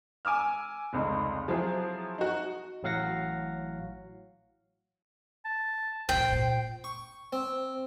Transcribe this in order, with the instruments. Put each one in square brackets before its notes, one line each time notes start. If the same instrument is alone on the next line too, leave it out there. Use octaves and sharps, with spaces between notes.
[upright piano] G#5 D6 E6 F6
F1 C#2 D#4
F3 F#3 C4 E4 F4 G#4
D#4 F#4
[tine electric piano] A1 A2 F#3 F5 F#5 A#6
[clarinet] A5
[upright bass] E1 A#1 [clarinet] C5 [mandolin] G5
[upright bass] A#2
[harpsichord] C#6
C4